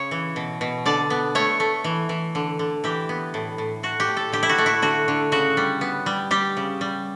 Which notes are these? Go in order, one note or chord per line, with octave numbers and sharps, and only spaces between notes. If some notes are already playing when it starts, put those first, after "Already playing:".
Already playing: C#3 C#5
E3
B2
B2
D3 D5
B3
A3 C#5
A3
E3
E3
D3
D3
E3 G4
B3
A2
A2
A2 F#4
G4
A2
A4
D3 G4
E4
F#4
A3
E4
D3 F#4
D3
C#3 F#4
G3
B3
G3
G3 G4
C#3
G3